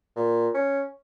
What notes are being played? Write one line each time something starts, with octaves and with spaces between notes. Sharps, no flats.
A#2
C#4